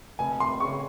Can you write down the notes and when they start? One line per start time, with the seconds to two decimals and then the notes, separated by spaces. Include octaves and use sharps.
0.19 F1 G#5
0.39 F1 C6
0.60 C#3 C#6